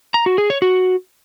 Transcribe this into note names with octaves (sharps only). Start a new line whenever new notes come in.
A#5
F#4
G#4
C#5
F#4